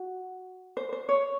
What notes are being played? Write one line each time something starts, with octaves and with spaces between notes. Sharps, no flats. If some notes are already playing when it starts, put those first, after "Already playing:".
Already playing: F#4
C5
C5
C#5